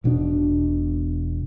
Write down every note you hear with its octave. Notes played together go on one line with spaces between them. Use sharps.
E1 B2 C#4 D4